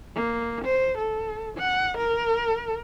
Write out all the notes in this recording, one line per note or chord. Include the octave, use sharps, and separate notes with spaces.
A#3
C5
A4
F#5
A#4